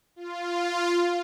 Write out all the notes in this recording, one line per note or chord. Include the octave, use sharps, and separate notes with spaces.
F4